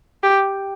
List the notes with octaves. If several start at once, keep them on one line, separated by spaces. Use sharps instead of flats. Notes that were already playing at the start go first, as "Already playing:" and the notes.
G4